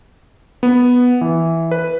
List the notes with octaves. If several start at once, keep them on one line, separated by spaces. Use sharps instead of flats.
B3
E3
B4